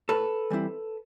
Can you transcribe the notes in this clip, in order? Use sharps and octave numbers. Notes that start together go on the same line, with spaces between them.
A2 A4 B4
E3 G3 C4 E4